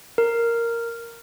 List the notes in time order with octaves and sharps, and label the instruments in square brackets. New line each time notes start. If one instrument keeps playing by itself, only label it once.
[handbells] A#4